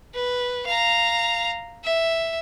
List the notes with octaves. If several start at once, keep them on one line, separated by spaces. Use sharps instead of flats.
B4
F5 A#5
E5